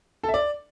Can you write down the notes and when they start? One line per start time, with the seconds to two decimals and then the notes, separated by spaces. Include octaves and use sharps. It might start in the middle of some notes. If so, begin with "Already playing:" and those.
0.23 A4
0.29 E5
0.34 D5